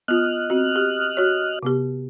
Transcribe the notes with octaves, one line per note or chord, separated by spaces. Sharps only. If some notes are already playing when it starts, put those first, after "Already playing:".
B3 F4 D#5 F6 F#6
C4 F#4
G4
F#4 C#5
C3 B3 G4